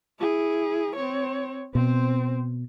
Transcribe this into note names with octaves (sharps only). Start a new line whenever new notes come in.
E4 G#4
C4 C#5
B2 C4 C5